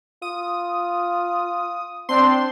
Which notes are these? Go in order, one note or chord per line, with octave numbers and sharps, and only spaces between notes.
F4 D#6
C4 D4 C6